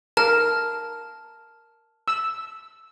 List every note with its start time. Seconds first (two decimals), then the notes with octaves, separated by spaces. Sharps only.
0.17 A#4 A5 F6
2.08 E6